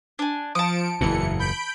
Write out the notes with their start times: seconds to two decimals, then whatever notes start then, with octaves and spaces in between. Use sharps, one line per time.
0.19 D4 G#5
0.55 F3 A5 D#6 C#7 D7
1.01 F#1 E2 A#2 E3 C#7
1.39 B5 G6 D7